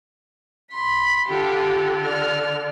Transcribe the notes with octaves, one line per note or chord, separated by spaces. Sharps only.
B5 C6
D3 F4 G4
D5 F6